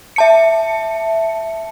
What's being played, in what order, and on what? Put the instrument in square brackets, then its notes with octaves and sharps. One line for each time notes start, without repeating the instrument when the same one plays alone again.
[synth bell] E5 A5 C#7